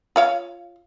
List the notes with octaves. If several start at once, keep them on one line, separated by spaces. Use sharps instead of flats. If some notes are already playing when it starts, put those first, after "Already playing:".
F4 C#5 F5